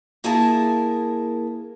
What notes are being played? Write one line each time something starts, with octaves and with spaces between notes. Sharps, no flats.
A#3 E4 G#4 A#4 A5